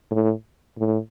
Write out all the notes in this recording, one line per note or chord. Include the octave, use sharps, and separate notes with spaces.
A2
A2